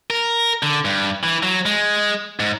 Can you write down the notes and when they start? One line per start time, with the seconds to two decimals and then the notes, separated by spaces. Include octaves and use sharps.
0.10 A#4
0.63 D3
0.85 G2
1.23 E3
1.43 F#3
1.66 G#3
2.40 G#2